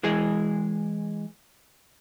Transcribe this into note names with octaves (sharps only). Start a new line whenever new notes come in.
E3 G#3 G#4